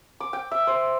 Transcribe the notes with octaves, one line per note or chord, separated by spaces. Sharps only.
D6
G5
E5
C5